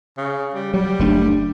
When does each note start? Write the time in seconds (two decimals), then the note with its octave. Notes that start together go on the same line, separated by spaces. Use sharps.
0.17 C#3
0.54 G3
0.74 F#3 G3
0.99 F#1 A3 D4